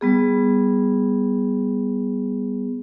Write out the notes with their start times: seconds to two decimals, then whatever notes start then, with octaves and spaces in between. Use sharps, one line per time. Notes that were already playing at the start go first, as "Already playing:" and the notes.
0.01 G3 B3 G#4